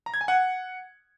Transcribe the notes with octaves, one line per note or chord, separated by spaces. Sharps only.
A#5
G#6
G#5
F#5